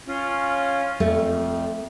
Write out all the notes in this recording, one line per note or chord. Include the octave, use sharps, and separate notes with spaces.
C#4 F4
F2 A3